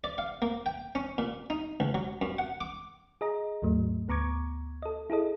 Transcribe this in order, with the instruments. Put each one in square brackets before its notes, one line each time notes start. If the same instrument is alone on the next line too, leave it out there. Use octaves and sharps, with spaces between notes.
[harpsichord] D5
F5
A#3
G5
C#4
A#2
D#4
C#2
F#3
F#2
F#5
D6
[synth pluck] G#4 D#5 A#5
D#2 G#2 F#3 A3
D2 B3 A#5 C#6 D6 G#6
A4 D#5
E4 G#4 A4 D#5